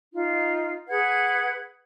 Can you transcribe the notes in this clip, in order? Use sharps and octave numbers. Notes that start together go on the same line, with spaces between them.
D#4 F4
G#4 B4 F#5 G#6